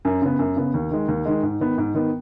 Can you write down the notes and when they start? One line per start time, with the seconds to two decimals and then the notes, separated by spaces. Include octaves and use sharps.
0.05 F#2
0.22 C#3 B3
0.39 F#2
0.56 C#3 B3
0.74 D#2
0.91 D#3 G#3
1.08 D#2
1.25 D#3 G#3
1.43 G#2
1.60 D#3 B3
1.78 G#2
1.94 D#3 B3